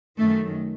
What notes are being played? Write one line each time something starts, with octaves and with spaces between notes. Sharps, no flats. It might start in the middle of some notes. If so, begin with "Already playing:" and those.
F#2 D#3 A3